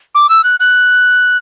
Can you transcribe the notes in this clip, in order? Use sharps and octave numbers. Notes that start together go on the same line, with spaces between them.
D6
E6
F#6
F#6